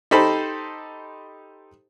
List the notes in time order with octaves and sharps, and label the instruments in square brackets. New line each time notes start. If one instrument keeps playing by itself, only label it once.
[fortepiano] D#4 G4 A4 C5 B5